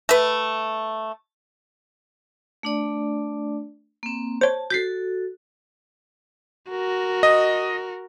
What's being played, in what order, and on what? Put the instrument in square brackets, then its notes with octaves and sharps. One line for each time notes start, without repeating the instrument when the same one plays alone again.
[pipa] A3 B4
[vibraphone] A3 D4 D5
A#3 C4
[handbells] C5 C#5 [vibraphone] A5
[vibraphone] F#4 A4 [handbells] G6 B6 C7
[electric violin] F#4 A#4
[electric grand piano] D#5